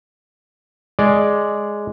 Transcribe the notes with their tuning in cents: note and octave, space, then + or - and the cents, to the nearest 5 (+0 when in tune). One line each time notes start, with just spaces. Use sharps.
G#3 +0 D5 +0